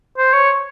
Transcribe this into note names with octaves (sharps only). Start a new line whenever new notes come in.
C5
C#5